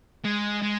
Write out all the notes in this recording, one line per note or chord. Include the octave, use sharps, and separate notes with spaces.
G#3
G#3